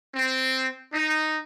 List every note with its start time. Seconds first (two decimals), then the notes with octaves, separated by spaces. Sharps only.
0.15 C4
0.93 D#4